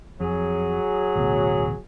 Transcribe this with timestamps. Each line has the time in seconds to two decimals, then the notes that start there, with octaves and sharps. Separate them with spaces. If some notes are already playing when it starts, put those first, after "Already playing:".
0.20 F2 F#3 G#4
1.15 A1 D2 B2